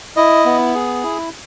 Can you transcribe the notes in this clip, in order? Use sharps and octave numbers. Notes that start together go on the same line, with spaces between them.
E4 D#5
B3
G#4
E4